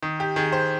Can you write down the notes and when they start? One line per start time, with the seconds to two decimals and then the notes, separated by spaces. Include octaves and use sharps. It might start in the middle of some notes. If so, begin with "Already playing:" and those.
0.03 D#3
0.20 G4
0.36 D#3 G#4
0.52 C5